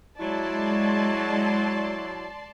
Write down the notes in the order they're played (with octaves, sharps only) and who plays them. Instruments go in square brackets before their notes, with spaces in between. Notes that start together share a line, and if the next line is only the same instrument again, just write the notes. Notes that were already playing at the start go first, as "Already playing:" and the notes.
[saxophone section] F#3 E4 [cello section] G#3 [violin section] D5 A5 C6